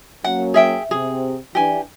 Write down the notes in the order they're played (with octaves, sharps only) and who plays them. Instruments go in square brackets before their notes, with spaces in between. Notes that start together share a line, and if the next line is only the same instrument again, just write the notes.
[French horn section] F#3 A#3 C#4 [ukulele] F#5
[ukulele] G#4 E5 G5
[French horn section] C3 C4 [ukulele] G#4
[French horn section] E3 D4 [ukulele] G4 G#5